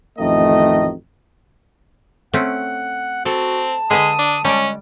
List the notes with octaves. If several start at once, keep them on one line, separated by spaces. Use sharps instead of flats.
A1 F2 D#3 A3 D#5
A3 C4 C#4 F#5
C4 F#4 A4 A5
D3 G#3 B4 D#5 D#6
D4
G3 G#3 C#4 D5